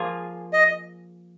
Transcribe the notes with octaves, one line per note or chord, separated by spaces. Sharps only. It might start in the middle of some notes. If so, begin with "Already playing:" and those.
Already playing: F3 A#3 F4 G#4
D#5